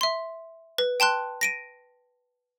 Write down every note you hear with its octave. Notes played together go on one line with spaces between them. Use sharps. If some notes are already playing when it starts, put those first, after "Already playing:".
E5 C6
B4
G5 A5 C6 F#6
A#6 D7 D#7